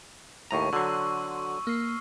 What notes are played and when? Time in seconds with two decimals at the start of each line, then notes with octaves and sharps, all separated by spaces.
0.51 D#2 A2 A#5 C#6 D#7
0.73 D3 F#3 F#4 C6 E6
1.67 A#3 F6 C7